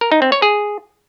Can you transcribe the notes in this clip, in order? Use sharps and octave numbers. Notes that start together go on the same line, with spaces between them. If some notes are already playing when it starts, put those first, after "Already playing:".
A#4
D#4
C4
C#5
G#4